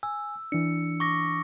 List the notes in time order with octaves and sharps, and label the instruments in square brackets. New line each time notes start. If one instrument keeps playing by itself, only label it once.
[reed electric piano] G#5 [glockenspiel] E6
[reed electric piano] E3 D4 [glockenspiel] C#7
[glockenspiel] C#6 D6 A#6